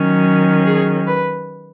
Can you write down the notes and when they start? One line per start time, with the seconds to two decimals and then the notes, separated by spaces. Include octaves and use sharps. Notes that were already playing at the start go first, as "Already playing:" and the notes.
Already playing: D#3 F#3 C#4
0.65 G#4
1.07 B4